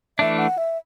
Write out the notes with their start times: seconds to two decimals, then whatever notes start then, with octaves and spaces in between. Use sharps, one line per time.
0.19 E3 A3 D4 E5
0.39 F#5
0.58 E5